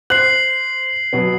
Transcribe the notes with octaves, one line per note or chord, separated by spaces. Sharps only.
C5 F#6 C7 F#7
B2 F#3 B3